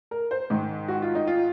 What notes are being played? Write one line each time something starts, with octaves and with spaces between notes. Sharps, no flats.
A#4
C5
G#2 D#3
F#4
F4
D#4
F4